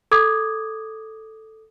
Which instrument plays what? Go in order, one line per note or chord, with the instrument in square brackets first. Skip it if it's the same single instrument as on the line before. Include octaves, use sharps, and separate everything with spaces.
[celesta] A4 D6 D#6 G#6